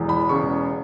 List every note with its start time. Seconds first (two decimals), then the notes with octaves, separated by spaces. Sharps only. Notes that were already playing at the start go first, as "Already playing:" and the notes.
Already playing: E1 E2 E3
0.09 B5
0.29 E1 E2 C#3 C#6